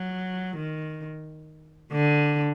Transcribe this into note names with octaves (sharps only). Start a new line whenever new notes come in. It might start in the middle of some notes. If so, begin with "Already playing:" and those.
Already playing: F#3
D#3
D3